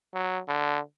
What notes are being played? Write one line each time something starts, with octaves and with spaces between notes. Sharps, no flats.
F#3
D3